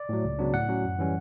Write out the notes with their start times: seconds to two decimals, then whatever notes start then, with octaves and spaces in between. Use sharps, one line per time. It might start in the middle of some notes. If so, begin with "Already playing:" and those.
Already playing: D5
0.09 A2 F#3
0.24 C#2
0.39 C#3 F#3 B3 D4
0.53 A2 F#5
0.68 F#3 C#4
0.85 F#2
0.99 E3 G3 C#4